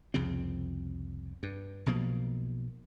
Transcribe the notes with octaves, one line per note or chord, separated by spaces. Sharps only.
C2 F2 C#3 C4
G2
B1 B2 F3 A#3